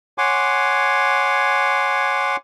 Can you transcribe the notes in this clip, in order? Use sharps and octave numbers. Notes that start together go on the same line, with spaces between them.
C#5 F#5 G#5 C6 D6